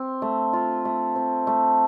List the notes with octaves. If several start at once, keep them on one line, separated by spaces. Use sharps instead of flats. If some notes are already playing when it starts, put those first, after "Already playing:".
Already playing: C4
A3
F4
A3
C4
A3